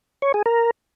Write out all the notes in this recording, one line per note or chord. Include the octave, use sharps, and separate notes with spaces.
C#5
G#4
A#4